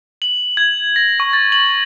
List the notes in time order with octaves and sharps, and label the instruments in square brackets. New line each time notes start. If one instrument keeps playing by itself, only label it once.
[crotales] F#7
G#6
A#6
C#6
A6
F#7